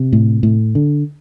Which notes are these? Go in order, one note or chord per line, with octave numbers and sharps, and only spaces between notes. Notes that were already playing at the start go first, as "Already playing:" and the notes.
Already playing: C3
A2
A2
D3